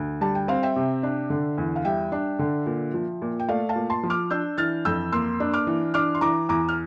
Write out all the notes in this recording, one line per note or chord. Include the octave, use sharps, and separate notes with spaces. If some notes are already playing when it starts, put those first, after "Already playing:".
Already playing: D2
G3 A5
G5
C4 F5
E5 G5
C3
D4
D3
E2
F5
G3 E5 G5
D4
D3
A#2
F3
A#2
G5
A3 D5 F5
F5 A5
A#2
A5 C6
F3
D6 F6
D4 E6 G6
E3 F6 A6
F2 E6 G6
A#3 C6 E6
D4
D6 F6
E3
D4 D6 F6
C6
E3 A#5 D6
E2 A#5 D6
F6